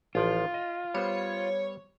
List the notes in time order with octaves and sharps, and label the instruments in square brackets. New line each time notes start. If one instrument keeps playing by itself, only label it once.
[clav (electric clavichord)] A1 F3 D5 [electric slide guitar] F4
[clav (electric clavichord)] D#5
[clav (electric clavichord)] G3 B3 C5 [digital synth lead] C#5